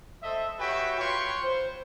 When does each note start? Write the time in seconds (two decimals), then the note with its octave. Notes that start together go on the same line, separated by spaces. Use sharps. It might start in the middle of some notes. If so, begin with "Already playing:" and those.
0.23 A4 C5 D#5 E5
0.59 F#4 G4 B4 C#5 E5 G5
0.99 F4 B4 C#5 G5 C6 C#6
1.42 C5